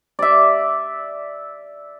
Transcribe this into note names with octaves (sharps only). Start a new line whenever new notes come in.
D5 E5